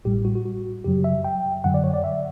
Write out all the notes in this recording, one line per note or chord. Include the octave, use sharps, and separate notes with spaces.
A1 A2 G3 G4
F#4
F#4
F#4
F#2 C#3 F#3 G4
E5
G5
F#2 D3 F#3 F#5
D5
C#5
D5
E5